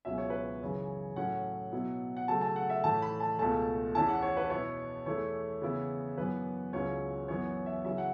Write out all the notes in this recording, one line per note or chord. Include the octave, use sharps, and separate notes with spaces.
C#2 B2 F#3 C#4 E5
C#5
B4
C#5
F#2 C#3 E3
A2 F#3 A3 C#4 F#5
B2 F#3 B3 E4
F#5
C#3 F#3 A3 A5
A5
F#5
E5
A2 E3 A3 A5
B5
A5
C#2 B2 A3 A5
E2 E3 C#4 E4 A5
F#5
C#5
B4
B2 B3 E4 C#5
E2 E3 A3 E4 C#5
C#3 E3 B3 E4
F#2 E3 B3 B4
C#2 C#3 F#3 C#4 E4 C#5
F#2 E3 B3 E4 C#5
E5
C#3 F#3 C#4 E4 E5
F#5